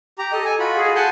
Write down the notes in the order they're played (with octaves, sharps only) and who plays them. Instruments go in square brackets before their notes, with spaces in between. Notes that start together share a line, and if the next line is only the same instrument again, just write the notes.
[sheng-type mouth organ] G4 A#5
[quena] A4 [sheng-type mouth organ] D#5
[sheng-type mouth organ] G#5
F4 F#4 B5
[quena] G#4
[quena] F#5 [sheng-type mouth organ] G#5 A5 G6